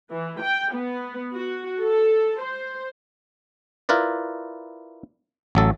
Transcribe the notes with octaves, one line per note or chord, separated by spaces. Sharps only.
E3
G5
B3
F#4
A4
C5
E4 F4 A#4 B4 D5
A1 F#3 A4